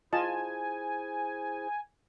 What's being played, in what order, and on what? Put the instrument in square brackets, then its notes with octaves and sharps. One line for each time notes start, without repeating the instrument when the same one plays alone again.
[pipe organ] E4 G#4 C5 [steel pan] F4 D#5 A5 [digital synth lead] G#5